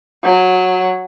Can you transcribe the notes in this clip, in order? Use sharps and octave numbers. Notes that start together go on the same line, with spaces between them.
F#3